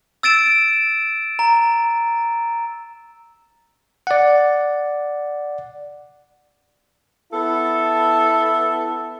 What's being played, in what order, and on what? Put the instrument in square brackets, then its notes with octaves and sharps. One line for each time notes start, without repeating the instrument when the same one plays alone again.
[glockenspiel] E6 A6 D7 E7
A#5
[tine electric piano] D5 F#5
[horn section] B3 E4 A4